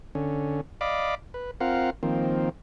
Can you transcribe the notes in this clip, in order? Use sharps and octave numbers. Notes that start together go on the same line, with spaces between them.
D3 C#4
D5 D#5 F5 B5 D6
B4
C4 F4 A#4 F5 F#5
D#3 F3 A#3 C4